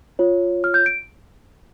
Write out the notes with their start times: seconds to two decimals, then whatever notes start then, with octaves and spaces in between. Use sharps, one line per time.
0.19 F4 C#5
0.64 F6
0.74 G6
0.86 D7